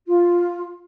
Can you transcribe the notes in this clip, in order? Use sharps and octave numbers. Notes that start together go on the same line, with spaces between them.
F4